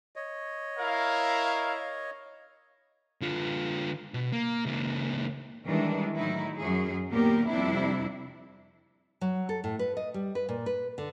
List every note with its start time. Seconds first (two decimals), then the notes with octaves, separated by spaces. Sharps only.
0.16 C#5 D#5
0.79 E4 A#4 F5
3.21 D3 F4
4.14 B2
4.32 A#3
4.66 C#2 A#3
5.65 D#3 E3 G3 G#3 D4
6.16 A2 D#3 F#3 D#4 E4
6.58 F#2 F#3 G#4
7.10 D#2 A#2 A#3 B3 G4 A#4
7.48 F2 C3 G3 C4 D4 E4
9.21 F#3
9.49 A4
9.64 A2
9.79 B4
9.97 D#5
10.14 G3
10.35 B4
10.49 A#2
10.66 B4
10.98 D3